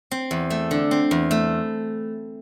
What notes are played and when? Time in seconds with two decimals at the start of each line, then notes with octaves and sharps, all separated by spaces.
0.11 C4
0.31 E2
0.50 A3
0.71 D3
0.91 C4
1.11 E2
1.31 A3